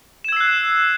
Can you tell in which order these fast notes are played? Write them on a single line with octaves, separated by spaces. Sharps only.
E7 G#6 E6 C7 F#6